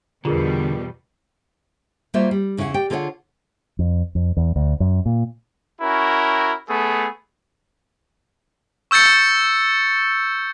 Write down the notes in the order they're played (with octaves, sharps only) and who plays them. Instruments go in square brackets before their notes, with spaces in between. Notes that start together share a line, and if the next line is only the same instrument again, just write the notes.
[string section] E2 B2 G3 [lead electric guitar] D3 [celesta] F4 G#4 A#4
[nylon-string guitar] G3 A#3 F4 F#4 C5 E5
G3
E2 C#3 E4 G#4 F#5
G4 D5 G5
D3 F4 G#4 C#5 F#5
[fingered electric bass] F2
F2
E2
D2
F#2
A#2
[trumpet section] C#4 E4 F#4 A#4
A3 B3 G#4 A4
[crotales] C#6 E6 G6 A6 C#7